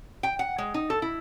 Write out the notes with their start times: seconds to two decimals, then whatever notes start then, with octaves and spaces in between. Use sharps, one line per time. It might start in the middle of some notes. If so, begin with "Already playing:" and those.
0.23 G5
0.39 F#5
0.58 G#3
0.74 D#4
0.90 A4
1.02 E4